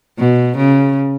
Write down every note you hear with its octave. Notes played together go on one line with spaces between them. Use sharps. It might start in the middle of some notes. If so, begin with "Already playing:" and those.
B2
C#3